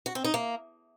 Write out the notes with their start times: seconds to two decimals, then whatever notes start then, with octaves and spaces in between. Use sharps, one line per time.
0.06 F#4
0.15 C4
0.25 D#4
0.34 A#3